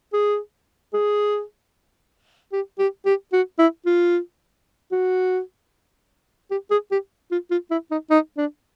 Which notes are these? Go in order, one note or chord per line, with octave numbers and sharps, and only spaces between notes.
G#4
G#4
G4
G4
G4
F#4
E4
F4
F#4
G4
G#4
G4
F4
F4
E4
D#4
D#4
D4